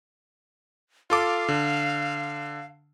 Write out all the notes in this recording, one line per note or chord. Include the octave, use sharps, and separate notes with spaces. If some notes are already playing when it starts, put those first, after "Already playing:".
F4 A4 F5 D6
D3